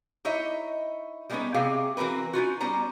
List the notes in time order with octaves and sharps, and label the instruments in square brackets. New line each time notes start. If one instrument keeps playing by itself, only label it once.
[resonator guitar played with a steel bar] D#4 E4 C#5 D#5 E5
G3 G#3 A#3 B3 C#4 D#4
C3 C4 G4 G#4 F5
E3 C4 F#4 A#4 B4
C#4 D#4 F4 F#4
G3 B3 C#4 C5 A#5